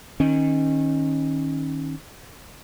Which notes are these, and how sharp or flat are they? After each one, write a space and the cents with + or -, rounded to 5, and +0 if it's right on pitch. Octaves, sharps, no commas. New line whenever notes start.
D#3 +0 C#4 -25